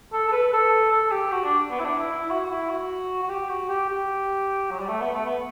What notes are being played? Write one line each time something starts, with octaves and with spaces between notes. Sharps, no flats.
A4
A4
B4
A4
A4
G4
F#4
D4
B3
E4
D4
E4
E4
F#4
F#4
E4
F#4
F#4
G4
F#4
G4
G4
F#3
G3
A3
B3
A3
B3